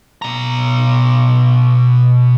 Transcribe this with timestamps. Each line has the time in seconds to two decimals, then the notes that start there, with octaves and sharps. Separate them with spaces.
0.22 B2 A#5